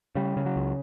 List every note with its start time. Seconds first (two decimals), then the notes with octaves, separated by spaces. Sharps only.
0.15 C#3 G3
0.37 C#3
0.46 F#3
0.56 C#2